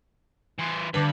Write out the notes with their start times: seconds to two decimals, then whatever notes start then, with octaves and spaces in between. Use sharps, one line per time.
0.59 E3 C5
0.94 G2 D3 B4